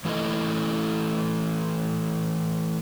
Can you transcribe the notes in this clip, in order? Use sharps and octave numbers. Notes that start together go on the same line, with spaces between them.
E3 A3 E4 A4 D#5